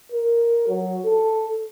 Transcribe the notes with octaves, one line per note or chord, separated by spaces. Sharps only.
A#4
F#3
A4